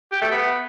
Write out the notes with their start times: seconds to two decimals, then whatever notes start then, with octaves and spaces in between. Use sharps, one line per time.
0.12 G4
0.22 A3
0.31 B3